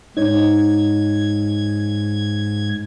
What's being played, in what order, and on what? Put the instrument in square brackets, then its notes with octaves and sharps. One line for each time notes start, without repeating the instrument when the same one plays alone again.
[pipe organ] G#2 G#6 [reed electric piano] D#4 C#5